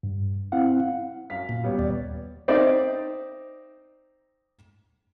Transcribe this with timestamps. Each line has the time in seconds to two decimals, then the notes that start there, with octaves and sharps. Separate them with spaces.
0.03 G2
0.52 C4 E4 F5 F#5
1.30 F#2 F5 B6
1.49 A#2
1.63 G3 B3 C#5
1.79 D#2 D5
2.48 C4 D#4 D5 E5